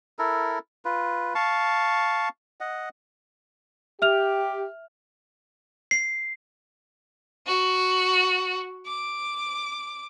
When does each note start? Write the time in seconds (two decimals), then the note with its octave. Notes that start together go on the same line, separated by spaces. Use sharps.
0.19 E4 A4 A#4
0.85 F4 B4
1.35 F5 A5 C#6
2.60 D#5 F#5
4.02 G4 E5 F6 F7
5.91 C7
7.46 F#4
8.86 D6